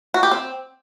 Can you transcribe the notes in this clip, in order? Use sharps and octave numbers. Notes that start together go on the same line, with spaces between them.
F#4
G4
C4